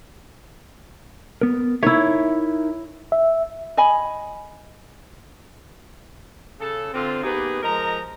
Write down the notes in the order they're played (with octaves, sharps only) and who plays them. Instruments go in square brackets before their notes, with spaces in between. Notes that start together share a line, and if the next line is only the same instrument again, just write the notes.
[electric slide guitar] B3 A#4
[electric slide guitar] D#4 A#4 E5 [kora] E4 C#5
[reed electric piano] E5
[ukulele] D#5 G#5 B5
[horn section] C#3 A4
D3 C4 F4
A#3 B3 D#4 G4 G#4 B4
F3 G#3 A#4 D#5 A#5